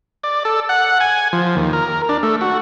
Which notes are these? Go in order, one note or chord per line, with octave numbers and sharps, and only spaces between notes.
D5
A4
F#5
G#5
F3
D#2
A#4
D4
A3
F#4